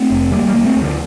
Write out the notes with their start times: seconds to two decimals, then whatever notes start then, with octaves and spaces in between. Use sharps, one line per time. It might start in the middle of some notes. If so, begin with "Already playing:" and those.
Already playing: A3 C4
0.10 F1
0.31 D2 G3 A#3
0.48 G3 A#3
0.54 D2
0.65 A3 C4
0.76 D2
0.81 D3 F3